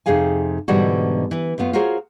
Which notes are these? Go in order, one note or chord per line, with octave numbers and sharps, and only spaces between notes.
F2 C3 D#4 G#4 F5 G#5
G#2 B2 D3 E3 G3 F#4
E3 B4
F#2 A3 B3 F4
F4 F#4 G#4 A#4 C5 C#5